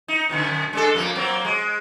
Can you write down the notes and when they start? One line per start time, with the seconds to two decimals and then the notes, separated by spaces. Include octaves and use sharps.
0.08 D#4
0.30 F#2 B2 D3
0.73 G#3 D4 A4
0.95 F2 A#3
1.15 F#3 A#3 C4
1.45 G#3